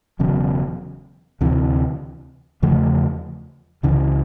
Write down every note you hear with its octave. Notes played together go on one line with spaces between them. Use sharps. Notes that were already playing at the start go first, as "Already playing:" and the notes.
E1 E2 C#3 F#3
D2 C3 E3
E2 C#3 F3 A3
C#2 C#3 E3